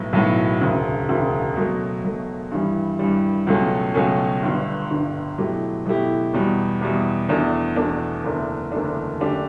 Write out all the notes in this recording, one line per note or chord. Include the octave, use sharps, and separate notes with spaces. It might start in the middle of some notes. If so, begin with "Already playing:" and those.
Already playing: B1 A2 F#3 B3
B1 A2 F#3 B3
E1 D2 C#3
E1 D2 C#3
B2 F#3 A3
B2 F#3 A3
G2 E3 G3
G2 E3 G3
C#2 B2 F#3 A3 C#4
C#2 B2 F#3 A3 C#4
G1 G2 D3
G1 G2 D3
B2 F#3 A3 E4 G4
B2 F#3 A3 E4 G4
E2 B2 G3
E2 B2 G3
E2 B2 A3 D4
E2 B2 A3 D4
F#1 E2 D3 A3 D4
F#1 E2 D3 A3 D4
F#2 D3 A3 D4 G4